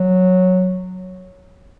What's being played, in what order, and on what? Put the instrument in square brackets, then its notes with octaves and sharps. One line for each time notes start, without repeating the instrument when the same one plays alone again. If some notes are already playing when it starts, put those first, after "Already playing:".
Already playing: [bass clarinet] F#3